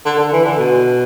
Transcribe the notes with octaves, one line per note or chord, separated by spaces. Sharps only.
D3
D3
E3
D3
B2